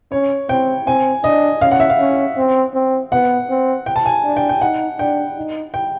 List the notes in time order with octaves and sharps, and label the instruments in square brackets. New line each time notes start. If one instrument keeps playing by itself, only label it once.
[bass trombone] C#4 [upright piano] C#5
[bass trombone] C4 [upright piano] G5
[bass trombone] C4 [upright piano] G#5
[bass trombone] D4 [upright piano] D#5
[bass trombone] C#4 [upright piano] F5
[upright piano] F#5
E5
F5
[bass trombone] C#4
C4
C4
[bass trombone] B3 [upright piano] F#5
[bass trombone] C4
[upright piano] G5
A5
G#5
[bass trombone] D4
[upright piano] G5
G5
[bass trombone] D#4 [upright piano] F#5
[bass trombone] D4 [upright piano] G5
[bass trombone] D#4
[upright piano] G5